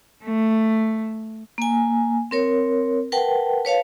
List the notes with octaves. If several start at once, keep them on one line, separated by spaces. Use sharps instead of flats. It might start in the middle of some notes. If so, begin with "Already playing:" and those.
A3
A#3 G#5
C4 A#4 C#5
A#4 B4 F#5 G5 A5
B4 C#5 F5 A5